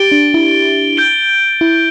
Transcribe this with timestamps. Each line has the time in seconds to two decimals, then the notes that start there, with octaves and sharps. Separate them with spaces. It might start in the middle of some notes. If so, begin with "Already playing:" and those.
Already playing: G4 A6 D7 G7
0.12 D4
0.34 E4
0.97 G6 D7 G7
1.61 E4